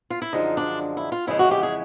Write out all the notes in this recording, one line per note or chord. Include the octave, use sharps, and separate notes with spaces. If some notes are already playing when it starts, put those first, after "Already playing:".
F4
E4
F#2 D3 F3 G#3 D#4
D4
E4
F4
F2 C#3 E3 G#3 E4
F#4
G4
G#4